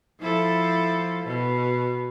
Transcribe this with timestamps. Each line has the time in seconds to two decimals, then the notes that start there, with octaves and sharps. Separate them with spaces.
0.20 F3 E4 A4
1.24 B2